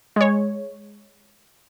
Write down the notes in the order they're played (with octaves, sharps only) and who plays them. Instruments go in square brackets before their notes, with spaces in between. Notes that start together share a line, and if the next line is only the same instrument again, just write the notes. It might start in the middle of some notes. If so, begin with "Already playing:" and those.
[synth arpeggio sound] G#3 C#5